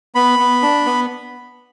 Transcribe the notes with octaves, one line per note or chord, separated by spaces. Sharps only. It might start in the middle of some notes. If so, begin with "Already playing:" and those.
B3 B5
B3
D4
B3